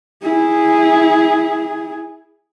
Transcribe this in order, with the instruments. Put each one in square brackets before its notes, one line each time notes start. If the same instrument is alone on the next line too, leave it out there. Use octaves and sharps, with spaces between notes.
[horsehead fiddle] E4 G#4